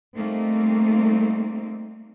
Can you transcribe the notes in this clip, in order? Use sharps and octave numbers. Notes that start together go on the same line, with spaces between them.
G3 A3 A#3 C4 D#4